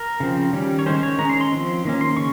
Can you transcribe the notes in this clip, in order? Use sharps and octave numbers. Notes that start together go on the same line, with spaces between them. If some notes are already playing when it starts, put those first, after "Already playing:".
Already playing: A#4
C#3 F3 C4
D#3 G3 C#4
C#5
D#3 G#3 C#4 C5
C#5
D#3 G#3 C#4 A#5
C6
C6
F3 C4
D#3 A#3 C#4
C6
C#3 C#6